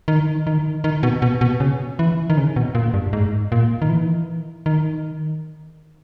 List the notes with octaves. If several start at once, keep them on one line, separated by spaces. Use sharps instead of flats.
D#3
D#3
D#3
B2
B2
B2
C#3
E3
D#3
C#3
B2
A#2
G2
G#2
A#2
D#3
E3
D#3